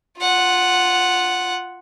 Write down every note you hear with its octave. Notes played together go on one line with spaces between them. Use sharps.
F4 F#5